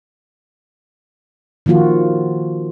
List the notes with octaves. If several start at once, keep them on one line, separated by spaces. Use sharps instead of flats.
D#3 F3 A#3 F4 F#4